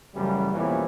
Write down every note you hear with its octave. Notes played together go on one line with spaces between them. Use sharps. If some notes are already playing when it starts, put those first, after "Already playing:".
A1 F#2 C#3 E3 G3
F2 B2 E3 G3 A#3 C#4